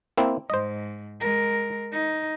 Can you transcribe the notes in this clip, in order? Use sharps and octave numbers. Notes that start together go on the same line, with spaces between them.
A#3 C4 E4
G#2 C5 D#5
G#3 A#4
D#4